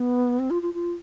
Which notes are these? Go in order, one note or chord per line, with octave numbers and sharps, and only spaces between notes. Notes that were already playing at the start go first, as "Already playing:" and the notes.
Already playing: B3
C4
F4
F4
F4